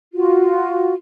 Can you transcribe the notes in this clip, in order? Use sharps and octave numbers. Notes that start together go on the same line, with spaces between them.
F4 F#4